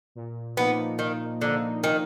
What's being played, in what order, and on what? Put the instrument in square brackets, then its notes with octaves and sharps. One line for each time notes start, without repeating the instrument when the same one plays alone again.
[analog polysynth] A#2
[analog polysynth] F3 A#3 D#4 [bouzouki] B3
[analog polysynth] A#2 [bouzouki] D#3
[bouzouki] D3 [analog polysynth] F3 A#3 D#4
[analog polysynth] A#2 [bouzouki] D#3